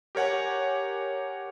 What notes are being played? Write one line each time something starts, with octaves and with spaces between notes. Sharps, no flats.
G4 A#4 C#5 F#5 G#5